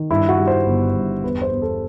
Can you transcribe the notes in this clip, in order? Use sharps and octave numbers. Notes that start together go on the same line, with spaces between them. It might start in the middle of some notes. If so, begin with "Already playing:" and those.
Already playing: D#3
G2 E4
F#4
G3
C5
G1
G2
E2 B4
C5
E2
A4